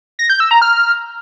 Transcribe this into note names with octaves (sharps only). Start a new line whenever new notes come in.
A#6
G6
E6
A#5
F6